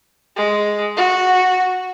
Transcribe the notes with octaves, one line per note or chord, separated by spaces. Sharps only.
G#3
F#4